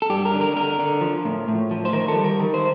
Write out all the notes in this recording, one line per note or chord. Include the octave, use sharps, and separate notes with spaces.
A4
G2 G4
A#4
D3
A#4
D3 A#4
D3
F3
A2
A2
F3
C5
D#3 A#4
A4
G3
A#4
D#3
C5